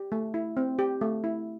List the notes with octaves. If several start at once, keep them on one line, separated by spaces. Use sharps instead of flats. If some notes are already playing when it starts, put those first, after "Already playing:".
Already playing: G4
A3
E4
C4
G4
A3
E4